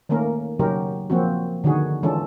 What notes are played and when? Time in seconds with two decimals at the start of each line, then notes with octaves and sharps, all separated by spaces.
0.09 D#3 A3 A#3 C#4 A#4
0.59 C#3 F#3 C#4 D#4 G4 A#4
1.10 F3 A#3 C4 C#4 F#4
1.64 D3 D#3 D#4 F#4 G#4
2.03 E3 G#3 C#4 D4 F4 A4